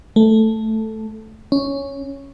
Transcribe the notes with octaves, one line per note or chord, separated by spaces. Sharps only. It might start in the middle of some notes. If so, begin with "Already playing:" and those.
A3
C#4